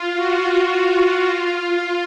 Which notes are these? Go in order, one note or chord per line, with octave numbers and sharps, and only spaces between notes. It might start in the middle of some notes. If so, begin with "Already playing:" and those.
Already playing: F4
F#4
F4
F4